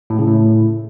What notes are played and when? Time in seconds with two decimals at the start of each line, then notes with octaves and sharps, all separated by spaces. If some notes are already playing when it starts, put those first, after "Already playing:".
0.10 A2
0.19 C#3
0.27 A2